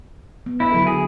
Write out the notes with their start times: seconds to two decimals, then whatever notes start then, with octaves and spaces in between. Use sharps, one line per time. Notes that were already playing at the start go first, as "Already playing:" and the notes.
0.46 B3
0.60 E4
0.72 D3 F#3 A4
0.87 G#4